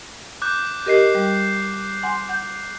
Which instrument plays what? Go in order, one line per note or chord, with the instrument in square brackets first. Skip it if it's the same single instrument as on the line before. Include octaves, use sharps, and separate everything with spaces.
[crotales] D6 F#6 G6
[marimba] G4 A#4 D#5 [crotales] G6 C7
[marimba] G3
F#5 G#5 C6
F#5 G6